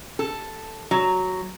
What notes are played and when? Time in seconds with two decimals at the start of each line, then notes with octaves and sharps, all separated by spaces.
0.19 A4
0.91 F#3